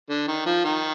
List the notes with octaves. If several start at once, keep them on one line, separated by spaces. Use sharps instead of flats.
D3
D#3
F3
D#3